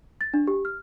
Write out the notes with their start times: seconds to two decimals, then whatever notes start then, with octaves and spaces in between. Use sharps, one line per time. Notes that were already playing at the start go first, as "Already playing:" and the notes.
0.21 A6
0.34 D4
0.48 G4
0.65 F6